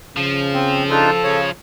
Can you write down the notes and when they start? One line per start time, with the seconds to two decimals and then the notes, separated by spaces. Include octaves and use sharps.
0.17 C#3 F3
0.54 C4
0.90 D4 D#4 F4 A4
1.24 C#3 C#5